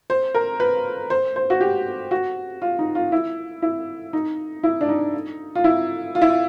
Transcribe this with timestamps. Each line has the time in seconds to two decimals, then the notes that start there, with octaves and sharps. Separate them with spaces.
0.10 C5
0.35 A#4
0.60 B4
1.10 C5
1.36 C5
1.50 F#4
1.61 G4
2.11 F#4
2.62 F4
2.79 D#4
2.95 F4
3.12 E4
3.62 E4
4.13 D#4
4.63 E4
4.81 D4
4.89 D#4
5.55 F4
5.64 E4
6.15 F4
6.21 E4
6.29 F4